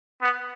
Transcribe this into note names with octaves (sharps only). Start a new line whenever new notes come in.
B3